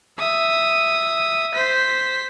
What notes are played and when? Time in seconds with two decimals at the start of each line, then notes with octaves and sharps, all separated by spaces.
0.19 E5 D#6
1.55 C5 B6